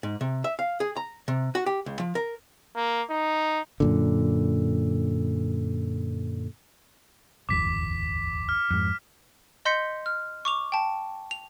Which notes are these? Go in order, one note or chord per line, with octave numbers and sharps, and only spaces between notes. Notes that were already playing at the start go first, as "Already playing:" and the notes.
G#2
C3
E5
F5
G#4
A#5
C3
F#4
G4
C#2
F3
A#4
A#3
D#4
F#2 A#2 D3
D1 G1 E2 D6 B6
F6
F2 G#2
D#5 C6 G6 B6 C#7
F6
C#6 D6 F7
G5 A5
F7